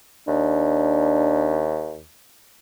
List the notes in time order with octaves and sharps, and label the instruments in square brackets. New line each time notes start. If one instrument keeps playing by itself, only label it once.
[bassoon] D#2 [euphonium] D4